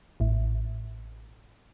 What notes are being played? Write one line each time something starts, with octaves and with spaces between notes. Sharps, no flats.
A1 A2